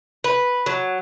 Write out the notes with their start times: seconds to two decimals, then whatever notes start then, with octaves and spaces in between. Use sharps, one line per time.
0.24 B4
0.66 F#3